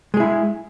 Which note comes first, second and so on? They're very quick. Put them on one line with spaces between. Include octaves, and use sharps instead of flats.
G#3 G#4 E4